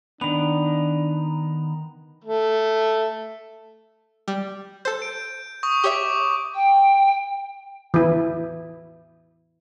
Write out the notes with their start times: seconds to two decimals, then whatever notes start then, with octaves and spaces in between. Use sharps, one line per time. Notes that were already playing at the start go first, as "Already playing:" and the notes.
0.21 D#3 B3 D4 B5 F7
2.25 A3
4.28 G3
4.85 A4 C5 G6
5.02 D7
5.63 C#6 D#6
5.84 G4 C#5 E5 D6
6.55 G5
7.94 E3 E4